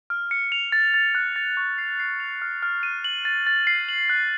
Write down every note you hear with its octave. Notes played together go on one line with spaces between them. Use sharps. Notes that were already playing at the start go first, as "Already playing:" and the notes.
F6
C#7
F7
A6
A6
F#6
A6
C#6
C7
C7
F7
F6
F6
D#7
F#7
A6
A6
C7
F#7
F#6